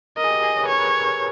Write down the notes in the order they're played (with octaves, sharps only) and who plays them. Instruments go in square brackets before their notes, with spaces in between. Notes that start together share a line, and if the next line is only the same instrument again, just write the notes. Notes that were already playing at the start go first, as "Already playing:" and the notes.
[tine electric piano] A#4 [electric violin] D#5
[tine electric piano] G#4
G4
G#4
C#5
B4
[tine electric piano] A#4 [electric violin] C#5
[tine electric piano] B4